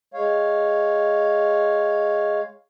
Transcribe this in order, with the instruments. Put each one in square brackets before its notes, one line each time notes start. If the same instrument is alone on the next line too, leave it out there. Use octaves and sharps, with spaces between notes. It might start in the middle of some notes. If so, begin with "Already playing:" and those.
[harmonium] G#3 C#5 F5